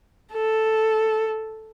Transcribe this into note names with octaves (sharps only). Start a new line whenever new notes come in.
A4